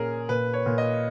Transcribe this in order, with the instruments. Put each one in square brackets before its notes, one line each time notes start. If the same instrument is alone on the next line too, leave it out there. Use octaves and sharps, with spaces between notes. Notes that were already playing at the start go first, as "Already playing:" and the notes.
Already playing: [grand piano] A#2 C#4 [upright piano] G#4 A#4
[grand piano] A#2 [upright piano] B4
[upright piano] C#5
[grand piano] A#2
[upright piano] D#5